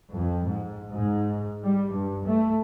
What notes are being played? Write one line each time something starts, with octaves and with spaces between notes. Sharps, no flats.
F2
G#2
G#2
G3
G2
A3